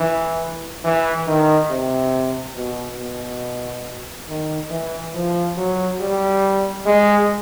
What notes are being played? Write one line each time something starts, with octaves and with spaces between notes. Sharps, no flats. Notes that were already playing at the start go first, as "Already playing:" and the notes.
Already playing: E3
E3
D#3
C3
B2
B2
D#3
E3
F3
F#3
G3
G#3